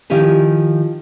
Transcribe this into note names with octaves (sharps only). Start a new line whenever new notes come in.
D#3 F3 E4 G4 G#5